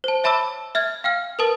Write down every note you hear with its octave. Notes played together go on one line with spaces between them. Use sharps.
C5 A5
C#5 E5 A5 B5 D6 E6
E5 F6 G#6
F5 G5 F6
A#4 B4 A5 D#6 A6